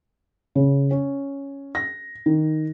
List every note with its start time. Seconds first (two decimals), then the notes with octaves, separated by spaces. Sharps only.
0.55 C#3
0.91 C#4
1.75 A#6
2.26 D#3